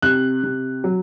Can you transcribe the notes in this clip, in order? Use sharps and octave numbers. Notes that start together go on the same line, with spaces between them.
C3 F#6
C3
F#3